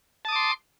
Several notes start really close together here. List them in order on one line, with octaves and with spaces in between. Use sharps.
A5 D#6 D6 C6